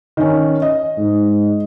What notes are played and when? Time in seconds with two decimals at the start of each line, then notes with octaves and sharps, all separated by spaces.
0.17 D#3 C#4
0.62 D#5
0.98 G#2